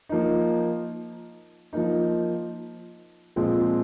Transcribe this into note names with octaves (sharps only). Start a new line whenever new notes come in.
F3 A#3 D#4
F3 A#3 D#4
A#2 F3 G#3 C4